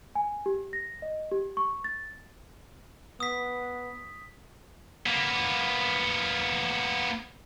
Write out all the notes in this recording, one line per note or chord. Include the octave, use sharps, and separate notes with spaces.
G#5
G4
A#6
D#5
G4
C#6
A6
B3 D#6 B6
A#3 B3